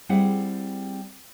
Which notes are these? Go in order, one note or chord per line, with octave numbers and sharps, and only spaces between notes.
G3 C4 E4 G#4 F#5